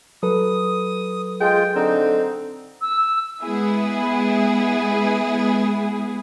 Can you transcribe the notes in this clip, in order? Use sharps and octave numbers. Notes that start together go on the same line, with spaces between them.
F#3 A4 B4 D#6
G#3 F4 G5
D3 C4 D#4
E6
G#3 B3 E4 G#4